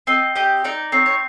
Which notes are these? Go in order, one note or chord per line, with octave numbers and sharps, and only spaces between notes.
C4 D#5
G4 D#5
D#4 D5
C4 C#5
C#5